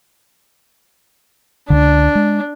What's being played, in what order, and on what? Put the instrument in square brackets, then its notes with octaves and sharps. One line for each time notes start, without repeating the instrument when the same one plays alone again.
[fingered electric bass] C#2 D3 [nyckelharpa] D4
[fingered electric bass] G#3